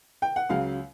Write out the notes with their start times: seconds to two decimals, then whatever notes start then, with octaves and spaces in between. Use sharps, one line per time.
0.22 G5
0.36 F#5
0.49 C#2 C#3 F#3 F5